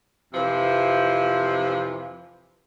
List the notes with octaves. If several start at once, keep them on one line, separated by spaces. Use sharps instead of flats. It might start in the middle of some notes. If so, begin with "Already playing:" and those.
F2 C3 E3 F3